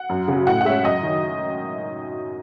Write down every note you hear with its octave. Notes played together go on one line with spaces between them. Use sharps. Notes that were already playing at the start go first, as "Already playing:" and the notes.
Already playing: F#5
F#2
C#3 F#3
A2 F#5
F#5
G#3 C#4 E5
F#2 D#5
D#3 F#3